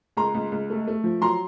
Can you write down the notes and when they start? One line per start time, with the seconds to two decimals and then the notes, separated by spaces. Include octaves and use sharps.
0.17 C#2 A#5 C6
0.34 C#2
0.52 C#2
0.70 A3
0.87 A3
1.04 F3
1.21 F#3 A#5 C6